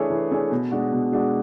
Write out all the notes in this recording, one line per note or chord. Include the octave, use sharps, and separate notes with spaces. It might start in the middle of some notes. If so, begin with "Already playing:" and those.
Already playing: E3 A3 D4 G#4 C#5
E3
A3 D4 G#4 C#5
B2
G#3 D4 F#4
B2
G#3 D4 F#4